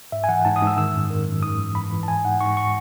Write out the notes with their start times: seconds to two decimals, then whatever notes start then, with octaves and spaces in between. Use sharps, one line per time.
0.12 G#2 E5
0.24 G#5
0.29 E3 F#5
0.45 G#2 A5
0.56 D#6
0.61 G#2
0.67 E6
0.77 D#3 E6
0.94 F#2
1.10 D#3
1.27 F#2
1.42 G#2 D#6
1.59 E3
1.75 E3 B5
1.92 E3
2.03 A5
2.08 G#2 G#5
2.24 G#2 F#5
2.41 G#2 C#6
2.57 C#6